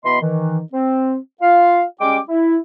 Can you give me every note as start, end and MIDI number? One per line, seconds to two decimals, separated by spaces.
0.05 0.21 47
0.05 0.21 52
0.05 0.21 59
0.05 0.21 75
0.05 0.21 83
0.05 0.21 84
0.21 0.60 51
0.21 0.60 52
0.73 1.17 60
1.42 1.84 65
1.42 1.84 77
2.01 2.19 55
2.01 2.19 56
2.01 2.19 61
2.01 2.19 79
2.01 2.19 86
2.29 2.58 64